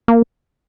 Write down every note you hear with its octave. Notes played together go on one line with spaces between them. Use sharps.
A#3